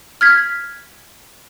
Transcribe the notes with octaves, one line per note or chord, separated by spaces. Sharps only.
F6 G#6 B6